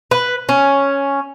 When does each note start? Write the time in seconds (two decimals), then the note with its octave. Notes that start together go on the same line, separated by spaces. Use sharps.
0.11 B4
0.49 C#4